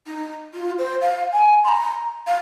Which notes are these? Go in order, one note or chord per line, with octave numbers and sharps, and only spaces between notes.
D#4
F4
C5
F5
G#5
C6
A#5
F5